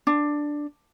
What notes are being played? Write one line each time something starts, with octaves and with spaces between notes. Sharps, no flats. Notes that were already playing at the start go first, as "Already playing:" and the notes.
D4